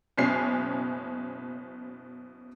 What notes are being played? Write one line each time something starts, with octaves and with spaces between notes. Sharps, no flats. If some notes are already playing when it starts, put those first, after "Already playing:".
F#1 B2 C#4 C7